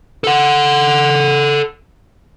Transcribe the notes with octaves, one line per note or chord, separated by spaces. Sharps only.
A4 F#5